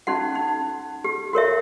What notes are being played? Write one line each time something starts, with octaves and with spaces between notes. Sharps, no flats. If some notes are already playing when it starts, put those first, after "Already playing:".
C#4 D#4 F#4 F#5
D#4
G4
F#4 A#4 C#5 E5